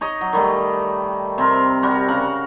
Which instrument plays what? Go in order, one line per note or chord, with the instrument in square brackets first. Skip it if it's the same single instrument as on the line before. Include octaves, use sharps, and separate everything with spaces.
[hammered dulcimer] D#4 C#5 D#5
F#3
D#3 G3 A3
C3 C4 A#4
G3 F#4 A#4
C#3 A#4 F#5